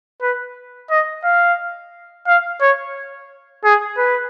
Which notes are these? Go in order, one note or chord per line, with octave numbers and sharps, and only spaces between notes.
B4
D#5
F5
F5
C#5
G#4
B4